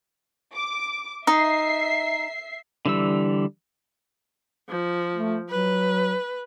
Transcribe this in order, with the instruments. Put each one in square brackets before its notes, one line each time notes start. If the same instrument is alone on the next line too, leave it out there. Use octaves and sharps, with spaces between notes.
[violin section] D6
[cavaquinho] D#4 [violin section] E5 C7
[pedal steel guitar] D3 E3 G3 E6
[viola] F3
[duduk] A3
[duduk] F#3 [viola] B4